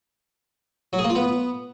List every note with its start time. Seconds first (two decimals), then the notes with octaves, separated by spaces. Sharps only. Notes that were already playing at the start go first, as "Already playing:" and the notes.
0.93 F#3
0.99 G#4
1.04 A#3
1.10 F4
1.15 B3